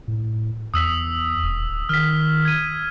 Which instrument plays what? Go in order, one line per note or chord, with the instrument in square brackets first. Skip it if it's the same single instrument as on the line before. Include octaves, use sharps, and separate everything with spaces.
[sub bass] A2
[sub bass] E2 [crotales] D#6 E6 B6
[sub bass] D#1
D1
[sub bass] D#3 [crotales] F6 B6
[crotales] G#6 D#7